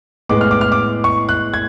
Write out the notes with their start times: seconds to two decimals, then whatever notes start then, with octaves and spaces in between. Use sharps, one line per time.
0.29 A2 G#3 B3 D6
0.41 F6
0.51 D6
0.61 F6
0.72 D6
1.04 C#6
1.29 F#6
1.54 G#6